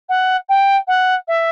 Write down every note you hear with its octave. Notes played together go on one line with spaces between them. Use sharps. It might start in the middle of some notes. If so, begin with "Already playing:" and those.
F#5
G5
F#5
E5